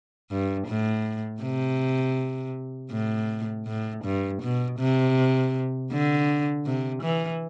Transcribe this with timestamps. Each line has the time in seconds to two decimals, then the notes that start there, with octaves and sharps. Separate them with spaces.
0.31 G2
0.68 A2
1.42 C3
2.92 A2
3.67 A2
4.04 G2
4.42 B2
4.79 C3
5.91 D3
6.66 C3
7.03 E3